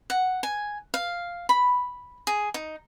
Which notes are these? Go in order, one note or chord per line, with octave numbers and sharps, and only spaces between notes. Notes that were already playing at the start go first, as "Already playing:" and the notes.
F#5
G#5
F5
B5
G#4
D#4